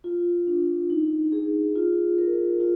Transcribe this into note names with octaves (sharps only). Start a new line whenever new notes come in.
F4
D4
D#4
G#4
F4
A#4
F4